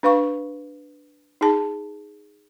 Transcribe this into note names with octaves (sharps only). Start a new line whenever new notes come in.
D4 B4 F5 C#6
D#4 G#4 A5